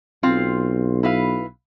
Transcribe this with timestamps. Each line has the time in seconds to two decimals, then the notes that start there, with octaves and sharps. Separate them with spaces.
0.23 B1 C4 F4 F5
1.03 E4 B4 F5